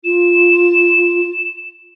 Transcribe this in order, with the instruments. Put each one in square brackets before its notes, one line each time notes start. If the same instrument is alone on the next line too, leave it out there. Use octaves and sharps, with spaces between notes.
[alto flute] F4 [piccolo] E7